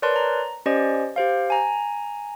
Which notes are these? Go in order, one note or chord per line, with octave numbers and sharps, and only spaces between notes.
A#4 B4 C#5 D5 A5 C6
A#5
C#4 G4 C5 D5 D#5
G4 C5 F5
G#5 A#5